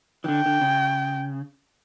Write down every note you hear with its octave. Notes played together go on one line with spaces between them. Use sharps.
E3
D3 G5
D3
C#3